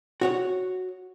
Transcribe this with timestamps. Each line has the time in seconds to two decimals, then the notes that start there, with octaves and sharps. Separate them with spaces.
0.21 F#4 C#5 F#5